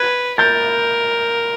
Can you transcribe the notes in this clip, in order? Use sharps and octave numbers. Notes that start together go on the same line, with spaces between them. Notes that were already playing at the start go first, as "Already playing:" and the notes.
Already playing: B4 F#6 G#6
A#4 G6 A6